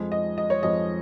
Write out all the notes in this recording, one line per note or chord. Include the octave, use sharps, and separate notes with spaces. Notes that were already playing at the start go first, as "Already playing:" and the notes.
Already playing: F2 F3 G#3
D#5
D#5
C#5
F2 F3 G#3 D#5